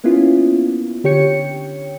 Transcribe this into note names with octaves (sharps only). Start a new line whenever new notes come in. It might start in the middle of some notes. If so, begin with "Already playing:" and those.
A#3 B3 C#4 E4 F4
D3 G4 C#5 G5 C#7